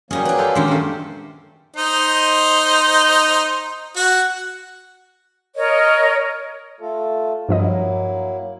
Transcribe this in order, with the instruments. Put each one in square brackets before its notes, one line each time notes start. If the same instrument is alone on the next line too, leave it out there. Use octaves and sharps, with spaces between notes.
[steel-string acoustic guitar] C#3 C#4 [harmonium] F#3 A#3 [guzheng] G3 G#4
[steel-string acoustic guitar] D4 B4
[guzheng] F4 A4 C5
[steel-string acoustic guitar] A#2 D#3 C5 [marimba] G#3 C#4 D4 [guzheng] G4
[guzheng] F#2 A3
[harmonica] D#4 C5 D#5
F#4 F#5
[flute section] A#4 C#5 D#5
[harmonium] A3 F4 A4
[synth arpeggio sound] G2 F3 D#5 [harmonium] F#3 A#3 E4